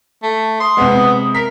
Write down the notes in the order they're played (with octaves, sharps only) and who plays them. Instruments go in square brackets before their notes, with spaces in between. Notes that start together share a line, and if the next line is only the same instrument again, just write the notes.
[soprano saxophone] A3
[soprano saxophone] C6 [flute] D#6
[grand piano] C3 G#3 [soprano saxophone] B3
[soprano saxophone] A#4 [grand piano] B6